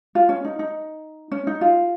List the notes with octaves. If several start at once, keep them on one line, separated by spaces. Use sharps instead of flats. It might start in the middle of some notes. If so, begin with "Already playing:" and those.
F4
C#4
D#4
D#4
C#4
D#4
F4